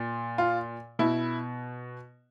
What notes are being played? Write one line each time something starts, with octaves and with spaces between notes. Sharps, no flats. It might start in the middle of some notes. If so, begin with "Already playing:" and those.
Already playing: A#2
F4
B2 E4